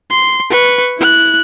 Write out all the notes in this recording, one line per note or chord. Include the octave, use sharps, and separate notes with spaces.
C6
B4 C#6
E4 F#6